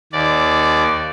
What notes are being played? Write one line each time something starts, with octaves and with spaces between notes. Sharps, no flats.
D#2 D5